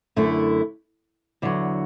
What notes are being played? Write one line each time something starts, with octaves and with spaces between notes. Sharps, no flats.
F#2 D3 A3 E4
E2 D3 F#3